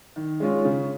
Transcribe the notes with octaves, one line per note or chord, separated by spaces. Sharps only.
D#3
G#3 C#4 F4
C#3